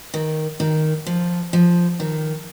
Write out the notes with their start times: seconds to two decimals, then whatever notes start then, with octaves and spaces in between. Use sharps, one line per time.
0.14 D#3
0.60 D#3
1.07 F3
1.53 F3
2.00 D#3